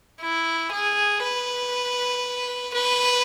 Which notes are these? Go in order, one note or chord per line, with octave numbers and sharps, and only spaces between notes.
E4
G#4
B4
B4